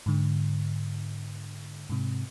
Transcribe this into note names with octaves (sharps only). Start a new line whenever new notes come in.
G#2 D3
G#2 C3